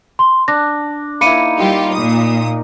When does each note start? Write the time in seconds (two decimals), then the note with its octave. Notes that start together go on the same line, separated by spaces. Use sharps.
0.19 C6
0.48 D4 A#6
1.21 A#3 D#4 E4 B5 C#7 D#7
1.58 G3 D#4 F4 G4 A#4
1.94 A#2 D#6